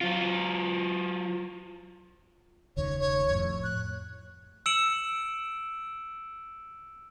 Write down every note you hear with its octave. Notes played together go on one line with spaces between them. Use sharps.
F#3 F4
E1 C#2 D#3 C#5
C#5
F2 A2
F#6
E6 C#7 D7 E7 F#7